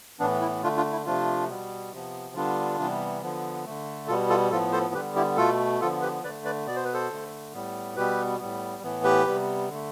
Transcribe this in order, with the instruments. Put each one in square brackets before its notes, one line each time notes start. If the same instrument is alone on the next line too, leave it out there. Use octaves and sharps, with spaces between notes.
[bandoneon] A2 E3 B3 D4
E4
D3 A3 D4 F4
D4 F4
E4
C3 F3 A3 D4 F4
B2 G3 B3
C3 F3 B3
D3 G3 B3 D4 F4
C3 E3 G3 B3
D3 F3 B3
D3 A3
B2 G3 B3 F4 A4
F4 A4
A2 F3 B3 F4 A4
A4 C5
D3 G3 B3 G4 B4
E4 G4
B2 A3 F4 A4
D3 F3 B3 F4 A4
G4 B4
D3 B4 D5
A3
B4 D5
B2 B3 D5
C5
B4
A4 C5
D3 A3
A2 G3 B3
B2 G3 B3 G4 B4
A2 G3 B3
A2 E3 B3
G4 B4
C3 G3 B3
D3 A3